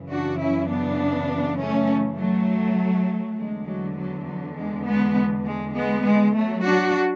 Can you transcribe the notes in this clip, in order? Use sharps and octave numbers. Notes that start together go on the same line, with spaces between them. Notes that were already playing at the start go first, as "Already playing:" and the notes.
Already playing: F#2 C#3 E3
D4 F#4
C#4 E4
B3 D4
A3 C#4
F#3 A3
E2 D3 G#3
F#3
F#3
F#3
G#3
G#3 B3
G#3
G#3 B3
G#3
F#3 A3
D4 F#4